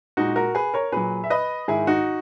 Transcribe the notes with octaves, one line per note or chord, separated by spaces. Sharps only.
A#2 G#3 D#4 F#4
F#4 A#4
G#4 B4
A#4 C#5
A#2 F#3 G#4 B4
E5
B4 D#5
G#2 D#3 G#3 E4 G#4
D#4 F#4